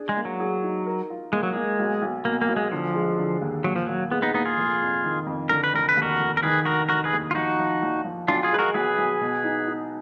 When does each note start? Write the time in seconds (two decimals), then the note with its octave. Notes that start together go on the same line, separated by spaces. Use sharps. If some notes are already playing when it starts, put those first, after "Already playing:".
Already playing: D4 G#4
0.09 G#3
0.17 A#3
0.25 F#3
0.40 G#4
0.63 D#4
0.86 A#4
1.10 F4
1.33 G#3 A#3
1.43 F#3
1.53 G#3 A#3
1.79 B1
2.02 B1
2.25 B2 A#3
2.41 A#3
2.48 B1
2.57 G#3
2.72 D3 F3
2.95 G#3
3.19 D3
3.41 D#2
3.64 A#2 F#3
3.76 F3
3.87 A#2 F#3
4.11 G#3 B3
4.22 B3 D#4
4.34 A#2 B3 D#4
4.45 F4 G#4
4.57 F1
4.81 F2
5.04 D#3
5.26 F2
5.49 D3 A#4
5.64 B4
5.73 F1 A#4
5.89 B4
5.96 D#2
6.02 F#4 A#4
6.20 F1
6.37 A#4
6.43 D#3 G#4 B4
6.65 F1 F#4 A#4
6.89 F1 F#4 A#4
7.04 G#4 B4
7.13 D#2
7.31 F4
7.35 F3 D#4 F#4
7.59 F3
7.82 A#1
8.05 F3
8.28 B1 D4 F4
8.43 F4 G#4
8.52 G#3 B4
8.59 F#4 A#4
8.74 B1 G#4 B4
8.98 B1
9.21 B2
9.44 D#4
9.67 D#4